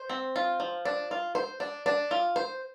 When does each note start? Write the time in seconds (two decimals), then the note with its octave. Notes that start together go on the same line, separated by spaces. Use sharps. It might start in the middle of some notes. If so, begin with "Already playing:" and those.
Already playing: C5
0.09 C4
0.36 F4
0.60 F3
0.85 D4
1.11 F4
1.35 C5
1.60 D4
1.86 D4
2.11 F4
2.36 C5